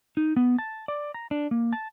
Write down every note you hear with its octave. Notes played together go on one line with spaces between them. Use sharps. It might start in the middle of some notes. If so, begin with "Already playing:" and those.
D#4
B3
A5
D5
A#5
D4
A#3
A5